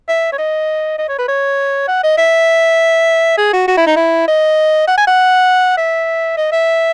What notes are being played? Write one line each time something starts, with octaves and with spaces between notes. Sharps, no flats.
E5
C#5
D#5
D#5
C#5
B4
C#5
F#5
D#5
E5
G#4
F#4
F#4
E4
D#4
E4
D#5
F#5
G#5
F#5
E5
D#5
E5